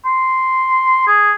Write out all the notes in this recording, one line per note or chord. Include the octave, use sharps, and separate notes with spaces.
C6
G#4